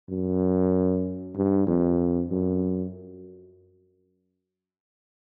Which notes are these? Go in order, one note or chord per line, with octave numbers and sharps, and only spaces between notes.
F#2
G2
F2
F#2